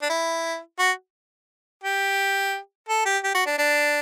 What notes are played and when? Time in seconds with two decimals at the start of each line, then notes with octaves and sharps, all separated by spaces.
0.02 D4
0.09 E4
0.79 F#4
1.84 G4
2.88 A4
3.05 G4
3.23 G4
3.34 F#4
3.46 D4
3.58 D4